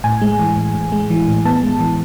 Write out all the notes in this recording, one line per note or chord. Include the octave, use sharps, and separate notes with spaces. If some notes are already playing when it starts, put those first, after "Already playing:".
A2 G#5
G#3
E3
A2
A2
G#3
E3
A2
B3 A5
G#3
E3